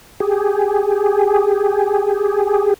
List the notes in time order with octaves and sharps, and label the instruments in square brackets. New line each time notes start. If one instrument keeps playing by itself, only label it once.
[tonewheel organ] G4 G#4